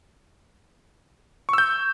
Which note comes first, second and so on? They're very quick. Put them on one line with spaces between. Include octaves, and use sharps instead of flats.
C#6 E6 G6